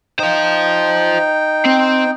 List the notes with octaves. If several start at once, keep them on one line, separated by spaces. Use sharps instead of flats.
D#4 C5 F5 G5
C4